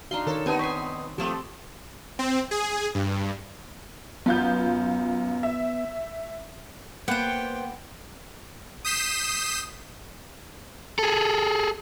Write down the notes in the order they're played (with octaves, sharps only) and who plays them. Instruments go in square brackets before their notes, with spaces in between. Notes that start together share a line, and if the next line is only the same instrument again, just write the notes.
[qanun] D4 D#4 C6 [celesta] F#4 A#5 [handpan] F5
[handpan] D#3 A#4 C#5 [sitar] A4
[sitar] B3 D#4 [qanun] C4 G#5 [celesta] G4 B4 A5
[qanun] C4 G#5 [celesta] C#6 B6 C7
[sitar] F3 A3 [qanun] C4 A4 [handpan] G4
[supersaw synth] C4
G#4
G2
[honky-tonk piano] F#2 F4 G6 [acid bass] B3
[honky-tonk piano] E5
[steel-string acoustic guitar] A#3 G4 [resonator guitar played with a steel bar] B3 [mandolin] C5 F#5 [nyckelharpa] G5
[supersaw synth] D#6 G6 B6 C7 E7
[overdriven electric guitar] G#4 A4